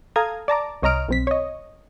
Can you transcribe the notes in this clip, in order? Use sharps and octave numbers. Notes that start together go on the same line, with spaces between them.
A4 F5 A#5 D#6 G#6
D5 A5 A#5 D6
C2 C#5 D#5 A#5 F6 D7
B1 C4 B6
C#5 D#5